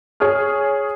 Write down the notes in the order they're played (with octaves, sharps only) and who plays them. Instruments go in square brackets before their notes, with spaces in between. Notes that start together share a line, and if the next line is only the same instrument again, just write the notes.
[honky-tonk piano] G#4 C#5 D#6 F6